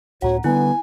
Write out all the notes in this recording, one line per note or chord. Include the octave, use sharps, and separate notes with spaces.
C#2 A2 F#4 C#5 F#5 A#5
D3 G3 B3 E4 G#5